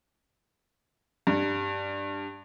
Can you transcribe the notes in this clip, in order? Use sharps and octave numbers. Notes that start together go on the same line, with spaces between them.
G2